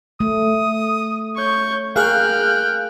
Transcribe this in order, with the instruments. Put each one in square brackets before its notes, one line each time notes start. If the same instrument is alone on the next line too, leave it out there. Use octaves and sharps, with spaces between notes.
[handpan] A3 [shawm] D#6
[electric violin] C#5 G6 [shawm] C#6
[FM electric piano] G#4 F5 [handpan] A#4 [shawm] G5 [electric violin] F6 F#6